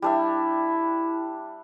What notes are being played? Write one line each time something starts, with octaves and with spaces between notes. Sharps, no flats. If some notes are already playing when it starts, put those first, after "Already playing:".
G3 D4 E4 E5